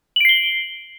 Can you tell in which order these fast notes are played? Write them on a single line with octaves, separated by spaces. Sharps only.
F#7 D7 C7 G7